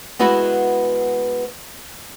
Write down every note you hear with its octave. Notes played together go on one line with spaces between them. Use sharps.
G#3 B3 E4 F#4 B4